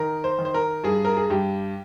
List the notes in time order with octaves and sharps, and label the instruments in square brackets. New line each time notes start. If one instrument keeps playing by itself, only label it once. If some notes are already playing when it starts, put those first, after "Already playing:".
Already playing: [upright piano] D#3 A#4
C5
D#3
C5
A#4
G2 G#4
A#4
G#4
G2 G4